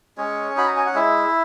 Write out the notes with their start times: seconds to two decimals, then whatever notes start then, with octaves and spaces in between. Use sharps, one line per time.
0.18 G#3 C#4 C#5
0.56 D#4 F#4 B5
0.67 A#5
0.76 G#5
0.86 F#5
0.94 G#3 E4 E5